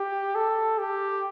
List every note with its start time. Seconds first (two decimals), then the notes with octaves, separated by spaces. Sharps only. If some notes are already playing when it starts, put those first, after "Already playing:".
Already playing: G4
0.35 A4
0.79 G4